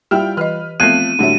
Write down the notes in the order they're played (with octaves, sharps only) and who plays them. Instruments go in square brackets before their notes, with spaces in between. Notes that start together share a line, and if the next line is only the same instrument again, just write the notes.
[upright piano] G3 F4 [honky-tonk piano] E4 G5 F6 [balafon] G4
[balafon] E3 D#5 [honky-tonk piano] B4 F6
[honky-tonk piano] F3 A3 [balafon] B3 C4 [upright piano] F#6 G#6 C7 [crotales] D#7
[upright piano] A2 [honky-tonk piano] D3 F#3 G3 [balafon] D4 E5